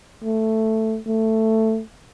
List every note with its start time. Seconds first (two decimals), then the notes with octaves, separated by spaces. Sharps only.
0.24 A3
1.06 A3